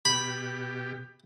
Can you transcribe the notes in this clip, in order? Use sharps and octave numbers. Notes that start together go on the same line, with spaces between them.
B2 G4 B5